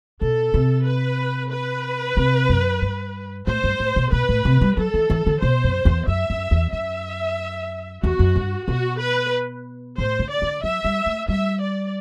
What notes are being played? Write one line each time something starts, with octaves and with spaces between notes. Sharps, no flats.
B2 A4
C3
B4
B4
C3
F#2
G2
A2 C5
G2
A2
B2
B2 B4
A2
C3
G3
F#3 A4
E3
E3
D3
B2 C5
F#2
E2
F#2 E5
F#2
E2
F#2 E5
E2 F#4
F#2
G2
B2 F#4
B4
A2 C5
D3
D5
D3
F#3 E5
G3
A3
G3 E5
D5